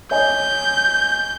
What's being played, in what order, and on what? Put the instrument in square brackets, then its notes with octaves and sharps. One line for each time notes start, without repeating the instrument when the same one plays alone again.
[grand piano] C#5 D#5 G#5 [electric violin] G6